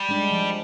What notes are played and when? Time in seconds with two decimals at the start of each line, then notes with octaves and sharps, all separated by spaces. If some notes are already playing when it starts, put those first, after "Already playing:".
Already playing: G3
0.09 G#3 D4
0.31 F3